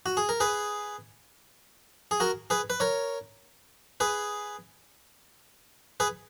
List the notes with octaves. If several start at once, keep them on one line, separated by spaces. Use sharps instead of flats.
F#4
G#4
A#4
G#4 B4
G#4
F#4 A#4
G#4 B4
B4
A#4 C#5
G#4 B4
G#4 B4